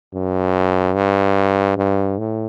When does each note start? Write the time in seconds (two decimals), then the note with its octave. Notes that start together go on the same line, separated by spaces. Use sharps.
0.14 F#2
0.95 G2
1.77 G2
2.18 A2